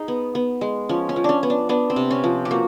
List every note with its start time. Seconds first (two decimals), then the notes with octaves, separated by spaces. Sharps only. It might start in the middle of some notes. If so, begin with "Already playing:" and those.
Already playing: D#4 G#4
0.08 B3
0.35 B3
0.61 G#3
0.89 F3 C#4
1.09 C#4
1.16 F3
1.24 C#4 D4
1.43 B3
1.50 D4
1.69 B3 D4
1.90 C4
1.96 C3
2.11 C#4
2.24 F3
2.45 G4
2.51 A#3 F#4